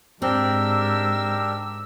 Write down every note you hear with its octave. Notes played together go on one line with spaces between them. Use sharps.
G#2 C4 D4 G4 A#4 E6